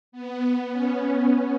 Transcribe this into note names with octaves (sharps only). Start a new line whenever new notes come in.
B3
C#4